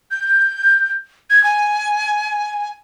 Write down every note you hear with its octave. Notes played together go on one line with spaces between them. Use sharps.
G6
G#6
G#5